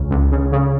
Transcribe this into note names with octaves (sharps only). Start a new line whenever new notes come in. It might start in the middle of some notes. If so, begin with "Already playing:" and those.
Already playing: C#2 C#3 C#4
C#2
C#3
C#3